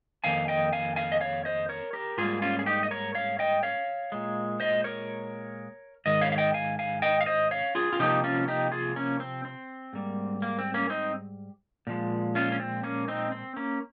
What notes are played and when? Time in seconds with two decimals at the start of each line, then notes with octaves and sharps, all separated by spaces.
0.24 F2 D#3 A#3 F5 G#5
0.48 D#5 G5
0.73 F5 G#5
0.96 F5 G#5
1.12 D#5
1.21 C#5 F5
1.45 C5 D#5
1.69 A#4 C#5
1.93 G4 A#4
2.17 G#2 G3 A#3 F4 G#4
2.42 C#4 F4
2.59 G#4
2.66 D#4 G4
2.83 D#5
2.91 A#4 C#5
3.15 C#5 F5
3.39 D#5 G5
3.63 C#5 F5
4.12 A#2 G#3
4.60 C5 D#5
4.84 A#4 C#5
6.06 G#2 D#3 D#5
6.21 C#5 F5
6.32 F5
6.38 D#5 G5
6.54 F5 G#5
6.79 F5 G#5
7.02 D#5 G5
7.21 F5
7.26 C5 D#5
7.51 C#5 F5
7.75 F4 G#4
7.93 F4
7.99 C3 F3 A#3 D#4 G4
8.24 C#4 F4
8.48 D#4 G4
8.72 F4 G#4
8.96 A#3 C#4
9.20 C4
9.45 C4
9.93 G#2 G3 A#3
10.42 A#3
10.58 C4
10.74 A#3 C#4
10.90 C4 D#4
11.87 A#2 F3 G#3
12.35 C#4 F4
12.52 C#4
12.60 C4
12.83 A#3 C#4
13.08 C4 D#4
13.32 C4
13.56 A#3 C#4